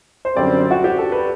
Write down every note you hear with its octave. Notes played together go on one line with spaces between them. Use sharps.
C5
F#2 D3 G3 C4 D5
F#4
G4
A4
B4